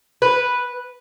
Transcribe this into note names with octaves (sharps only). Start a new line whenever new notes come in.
B4